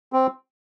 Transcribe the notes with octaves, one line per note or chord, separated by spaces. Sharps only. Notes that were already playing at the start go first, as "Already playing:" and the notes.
C4